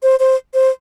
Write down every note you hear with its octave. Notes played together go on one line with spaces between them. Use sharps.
C5
C5
C5